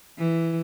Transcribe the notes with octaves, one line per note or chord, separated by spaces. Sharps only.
E3